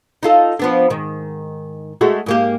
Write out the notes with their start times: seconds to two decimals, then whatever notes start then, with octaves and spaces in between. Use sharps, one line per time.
0.23 D#4 F4 A4
0.59 F3 B3 D4
0.90 G#2 D#3
2.01 G#3 A3 F#4
2.26 G#2 A#3 G4